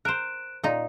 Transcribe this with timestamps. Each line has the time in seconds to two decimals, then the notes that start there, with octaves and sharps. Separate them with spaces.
0.05 A#4 C5 F#6 D7 E7
0.64 A#2 D#4 D#5